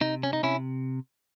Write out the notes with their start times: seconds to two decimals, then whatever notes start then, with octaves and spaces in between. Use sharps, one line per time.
0.01 C3 D#4
0.23 C#4
0.33 D#4
0.43 C3 C#4 E4